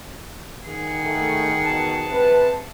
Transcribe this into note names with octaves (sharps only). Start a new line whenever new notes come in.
D#3 G#4 F#5
A3
B2 A5
C3 B4